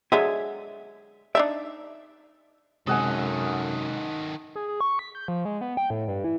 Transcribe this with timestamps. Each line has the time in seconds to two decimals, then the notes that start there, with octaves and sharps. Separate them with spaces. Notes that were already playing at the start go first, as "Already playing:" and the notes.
0.12 D3 F#3 G#3 G#4 E5
1.35 D4 D#4 D5 E5
2.87 F#2 C3 D#3 G#3 A4 D#5 F#5 G#5
4.56 G#4
4.68 G#4
4.81 C#6
4.99 B6
5.15 G6
5.28 F3
5.45 G#3
5.61 B3
5.77 G5
5.90 A2
6.08 G2
6.24 E3